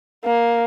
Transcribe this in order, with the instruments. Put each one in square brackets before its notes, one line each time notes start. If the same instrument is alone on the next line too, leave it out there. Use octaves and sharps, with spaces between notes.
[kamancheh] A#3